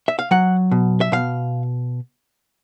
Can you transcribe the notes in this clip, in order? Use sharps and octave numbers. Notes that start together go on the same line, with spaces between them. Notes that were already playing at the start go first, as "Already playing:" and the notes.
E5
F5
F#3 F#5
B2
E5
B2 F5